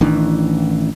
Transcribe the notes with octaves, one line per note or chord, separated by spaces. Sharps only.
A1 D#3 E3 D4